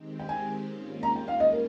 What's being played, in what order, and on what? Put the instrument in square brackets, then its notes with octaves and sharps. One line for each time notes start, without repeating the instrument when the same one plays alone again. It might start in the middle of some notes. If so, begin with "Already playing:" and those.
Already playing: [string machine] D#3 G#3 C4 G4
[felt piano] G5
G#5
[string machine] G#2 G3 A#3 C#4 F4
[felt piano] A#5
G5
F5
D#5
A#4